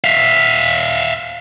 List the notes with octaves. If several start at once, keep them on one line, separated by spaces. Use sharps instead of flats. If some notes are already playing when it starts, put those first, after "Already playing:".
E5 F5